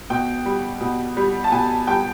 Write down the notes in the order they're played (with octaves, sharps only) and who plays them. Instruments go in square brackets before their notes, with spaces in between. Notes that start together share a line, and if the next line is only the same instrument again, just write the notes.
[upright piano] B2 G5
G3
B2
G3
A5
B2 G#5
G3 G5